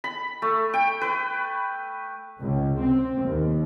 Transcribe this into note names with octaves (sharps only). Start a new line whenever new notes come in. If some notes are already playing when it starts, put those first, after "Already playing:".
B5
A3
G5
B4
C#2
C4
D#2